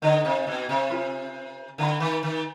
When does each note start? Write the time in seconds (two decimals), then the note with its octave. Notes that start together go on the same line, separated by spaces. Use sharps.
0.02 D3 D#4 B4 D#5
0.25 C3
0.47 B2
0.69 C3
0.90 F4 G#4 B4
1.78 D3 B4 F5 B5
2.00 D#3
2.23 D#3